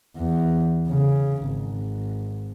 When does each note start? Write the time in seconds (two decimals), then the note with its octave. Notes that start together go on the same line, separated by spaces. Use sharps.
0.17 E2
0.88 C#3
1.45 G#1